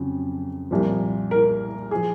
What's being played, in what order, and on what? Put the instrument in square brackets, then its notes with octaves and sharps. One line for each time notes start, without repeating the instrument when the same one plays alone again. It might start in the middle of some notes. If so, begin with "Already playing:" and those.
Already playing: [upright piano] F2 C#3 F#3
C2 A#2 F3
A#4
F3 G#4